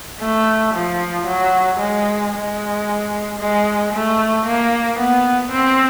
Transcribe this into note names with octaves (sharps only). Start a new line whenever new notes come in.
A3
F3
F#3
G#3
G#3
G#3
A3
A#3
B3
C4